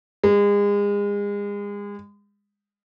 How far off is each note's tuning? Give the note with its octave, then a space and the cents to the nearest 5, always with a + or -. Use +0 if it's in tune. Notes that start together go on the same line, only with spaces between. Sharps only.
G#3 -35